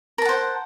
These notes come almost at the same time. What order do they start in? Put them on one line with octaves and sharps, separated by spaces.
A#4 A5 F#5 C5